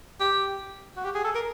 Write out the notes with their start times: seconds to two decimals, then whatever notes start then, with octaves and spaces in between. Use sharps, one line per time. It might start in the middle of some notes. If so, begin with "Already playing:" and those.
0.20 G4
0.97 F#4
1.04 G4
1.15 G#4
1.24 A4
1.35 A#4